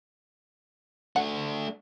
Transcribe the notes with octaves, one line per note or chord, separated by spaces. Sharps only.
A3 D4 F#5